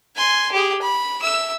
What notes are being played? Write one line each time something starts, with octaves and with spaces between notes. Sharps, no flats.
G#5 C6
G4 G#4
B5
E5 E6